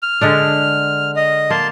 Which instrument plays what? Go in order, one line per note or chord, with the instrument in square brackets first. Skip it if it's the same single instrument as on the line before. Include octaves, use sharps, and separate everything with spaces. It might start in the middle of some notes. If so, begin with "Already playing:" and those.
[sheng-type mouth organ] F6
[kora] D3 G#3 D4
[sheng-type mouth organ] D#5
[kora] A#3 [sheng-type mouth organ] A5 C6